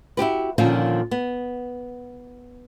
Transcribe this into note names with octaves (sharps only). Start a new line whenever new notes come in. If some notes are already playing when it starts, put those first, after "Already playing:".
E4 F#4 G4 B4
A#2 D3 D#3 F3 C#4
B3